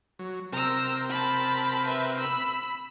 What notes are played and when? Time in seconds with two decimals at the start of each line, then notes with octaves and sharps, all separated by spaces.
0.19 F#3
0.53 C3 C4 A#4 A#5 E6
1.10 A5 B5
1.86 B4 E5
2.18 B5 E6